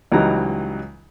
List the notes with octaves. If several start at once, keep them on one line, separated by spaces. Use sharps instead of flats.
C#2 E3 F#3 G3 D#4 A#5